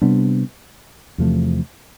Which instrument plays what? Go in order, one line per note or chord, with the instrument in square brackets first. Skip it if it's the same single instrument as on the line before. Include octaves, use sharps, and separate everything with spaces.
[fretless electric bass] C3 G3 B3 D4
E2 C3 F3 A3